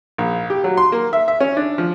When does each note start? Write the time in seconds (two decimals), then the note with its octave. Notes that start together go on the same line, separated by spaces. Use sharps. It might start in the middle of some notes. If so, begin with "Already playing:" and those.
0.18 A#1
0.50 G4
0.64 F#3
0.77 C6
0.92 A#3
1.13 E5
1.28 E5
1.40 C#4
1.57 D4
1.78 F3